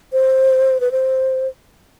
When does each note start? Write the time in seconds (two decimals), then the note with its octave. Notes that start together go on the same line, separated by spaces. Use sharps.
0.13 C5
0.80 B4
0.92 C5